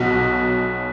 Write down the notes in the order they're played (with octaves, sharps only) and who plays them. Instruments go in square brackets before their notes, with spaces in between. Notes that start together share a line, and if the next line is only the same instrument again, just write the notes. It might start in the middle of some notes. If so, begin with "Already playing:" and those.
Already playing: [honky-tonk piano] B1 B2 F#3 F#4